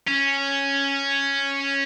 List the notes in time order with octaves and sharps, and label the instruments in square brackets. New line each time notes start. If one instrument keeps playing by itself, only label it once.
[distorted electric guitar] C#4